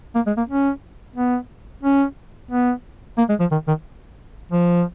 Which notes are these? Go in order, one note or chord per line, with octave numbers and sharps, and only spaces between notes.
A#3
G#3
A#3
C#4
B3
C#4
B3
A#3
G#3
F3
D#3
D#3
F3